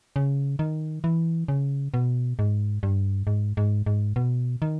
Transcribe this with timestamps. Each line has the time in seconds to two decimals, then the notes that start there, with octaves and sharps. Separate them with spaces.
0.16 C#3
0.59 D#3
1.04 E3
1.48 C#3
1.94 B2
2.39 G#2
2.83 G2
3.27 G#2
3.57 G#2
3.86 G#2
4.16 B2
4.62 D#3